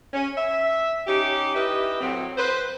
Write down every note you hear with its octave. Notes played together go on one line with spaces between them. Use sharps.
C#4
E5
C#4 D#4 G4
E4 G4 B4 D#5 E5
A2 F#3 C4
B4 C5